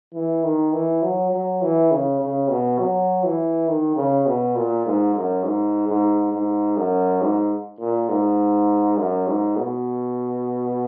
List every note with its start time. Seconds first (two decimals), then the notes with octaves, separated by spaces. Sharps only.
0.14 E3
0.44 D#3
0.73 E3
1.02 F#3
1.32 F#3
1.62 E3
1.91 C#3
2.21 C#3
2.50 B2
2.79 F#3
3.24 E3
3.68 D#3
3.97 C#3
4.26 B2
4.56 A#2
4.86 G#2
5.15 F#2
5.44 G#2
5.89 G#2
6.33 G#2
6.77 F#2
7.22 G#2
7.80 A#2
8.09 G#2
8.98 F#2
9.27 G#2
9.57 B2